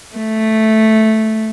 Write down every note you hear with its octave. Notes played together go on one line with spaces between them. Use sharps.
A3